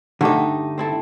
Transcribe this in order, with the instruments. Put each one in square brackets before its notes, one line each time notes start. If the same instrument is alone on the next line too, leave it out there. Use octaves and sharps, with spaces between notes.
[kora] G2 A3 G4 [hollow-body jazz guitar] D3 D#4
[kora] C4 E4 A4